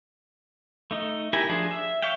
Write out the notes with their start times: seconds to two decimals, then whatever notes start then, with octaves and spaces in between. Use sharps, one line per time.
0.91 A3 D#4
1.33 E4 G4 A#4 G#5
1.49 F3 D4 G#4
1.71 E5
2.02 C#5 E5 F5 G5